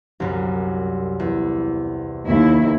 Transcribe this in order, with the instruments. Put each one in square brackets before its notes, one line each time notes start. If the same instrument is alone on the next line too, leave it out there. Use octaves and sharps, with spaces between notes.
[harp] C2 F#2
E2
[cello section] D#2 E4